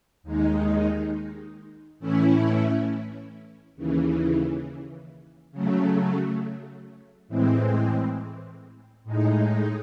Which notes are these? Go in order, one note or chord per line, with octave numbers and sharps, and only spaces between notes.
D#2 D#3 G#3 D#4
A2 E3 A3 C#4 E4
D#2 C#3 E3
C#3 F#3 A3
A2 E3 G#3 C4
A2 G#3 D#4